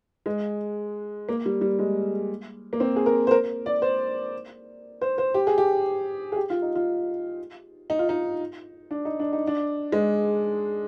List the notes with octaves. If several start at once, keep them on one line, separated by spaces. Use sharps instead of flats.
G#3
A#3
G3
G3
G#3
A#3
C4
G#4
A#4
C5
A#4
D5
C5
C5
C5
G4
G#4
G4
G#4
G4
F4
D#4
F4
D#4
F4
D#4
D4
D#4
D4
D#4
D4
G#3